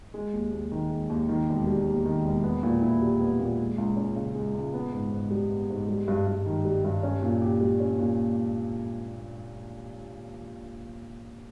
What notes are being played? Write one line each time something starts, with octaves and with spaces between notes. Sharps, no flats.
G#3
D#2
D#2
D#3
G#3
D#2
D#3
E1
G3
D#2
D#3
E1
B3
A#2
E4
G3
B3
A#2
G#3
C#2
C#4
C#3
G#3
C#2
B3
G#2
G#2
G3
B3
G#2
G3
G2
G2
D#3
G3
G2
C#4
A#2
G4
G3
C#4
A#2